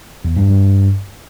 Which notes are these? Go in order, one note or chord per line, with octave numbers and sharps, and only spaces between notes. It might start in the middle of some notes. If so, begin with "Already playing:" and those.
E2
G2
G2